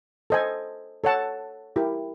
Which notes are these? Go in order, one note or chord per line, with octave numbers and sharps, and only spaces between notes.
A4 C5 D#5 G#5
A4 C#5 F#5 A5
E4 G4 A#4